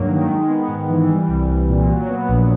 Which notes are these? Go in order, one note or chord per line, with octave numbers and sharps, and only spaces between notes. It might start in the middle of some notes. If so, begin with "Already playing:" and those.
Already playing: G2 F#3 A#3
D#3
G#3
B3
G#2
E3
G3
C2
C2
A#2
F#3
B3
A#1